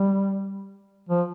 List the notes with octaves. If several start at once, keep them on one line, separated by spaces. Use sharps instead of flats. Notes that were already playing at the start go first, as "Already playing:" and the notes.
Already playing: G3
F3